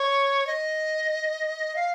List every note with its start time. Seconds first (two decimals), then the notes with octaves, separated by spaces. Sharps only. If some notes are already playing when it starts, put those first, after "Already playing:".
Already playing: C#5
0.47 D#5
1.76 F5